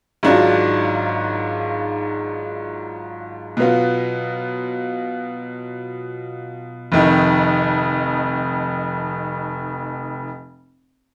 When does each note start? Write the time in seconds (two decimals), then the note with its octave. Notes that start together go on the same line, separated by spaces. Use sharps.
0.23 G#1 G#2 F#3 D4 F4
3.57 B2 F#3 B3 F4
6.92 F1 F2 D#3